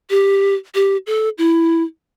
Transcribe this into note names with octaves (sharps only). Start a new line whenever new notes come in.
G4
G4
A4
E4